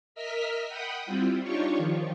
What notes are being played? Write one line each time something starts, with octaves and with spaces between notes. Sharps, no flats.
A#4 D#5 E5 F6 B6
F#5 G5 B5 D#6
G3 C4 E4 F4
D4 D#4 F4 G4 C#5 C#6
D#3 F3